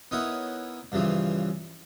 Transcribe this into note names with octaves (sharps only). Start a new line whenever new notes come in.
B3 D#4 E4 A#4 C#5 F#5
G2 C#3 E3 F3